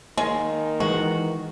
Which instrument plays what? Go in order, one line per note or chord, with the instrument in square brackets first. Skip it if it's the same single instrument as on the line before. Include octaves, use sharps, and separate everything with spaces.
[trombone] D#3 [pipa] G#3 [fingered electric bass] A#3
[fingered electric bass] E3 G#3 [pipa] F#4